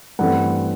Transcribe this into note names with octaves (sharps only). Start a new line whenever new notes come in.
G2 E3 A3 C4 F#5